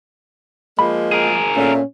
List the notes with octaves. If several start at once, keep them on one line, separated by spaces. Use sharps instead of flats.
F3 G#3 A#3 B5
G#4 A#4
A#2 A3 C#4